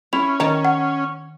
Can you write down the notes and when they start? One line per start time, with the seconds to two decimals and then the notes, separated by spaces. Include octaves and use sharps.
0.13 C#4 E4 F7
0.40 D#3 C#5 A5 A#5
0.65 F#5